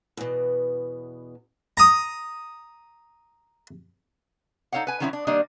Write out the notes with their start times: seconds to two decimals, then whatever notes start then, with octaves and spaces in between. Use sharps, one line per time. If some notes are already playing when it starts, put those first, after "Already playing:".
0.17 E2 B2
1.77 A#5 D#6
4.72 D#4 A4 C#5 F5 F#5
4.87 B4 G#5
5.00 D#3 F3 F#3 C#4 D#4 E4
5.13 D4
5.27 D#3 G3 A#3 D4 D#5